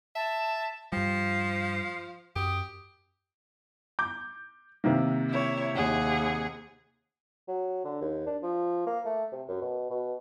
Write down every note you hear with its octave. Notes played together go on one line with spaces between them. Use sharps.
E5 A5
G2 F3 G3 C7
F#2 G4 D#6
D6 G6
C3 D#3 A#3
E4 C#5
D#2 G#4 F#5
F#3
D3
D#2
D4
F3
A#3
A3
C3
F#2
B2
B2